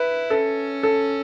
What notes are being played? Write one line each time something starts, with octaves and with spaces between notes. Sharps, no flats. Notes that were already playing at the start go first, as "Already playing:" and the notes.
Already playing: E4 B4
C#4 A4
A4